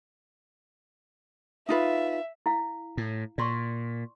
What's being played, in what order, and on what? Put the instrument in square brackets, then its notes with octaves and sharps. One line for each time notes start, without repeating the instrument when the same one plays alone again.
[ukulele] D#4 F4 B4 [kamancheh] E5
[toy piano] E4 F5
[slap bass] A2
[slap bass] A#2 [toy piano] D5 C6 C#6